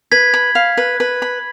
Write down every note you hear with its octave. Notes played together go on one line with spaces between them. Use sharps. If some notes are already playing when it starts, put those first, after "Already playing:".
B4 G#6 B6
B5
F5
B4
B4
B5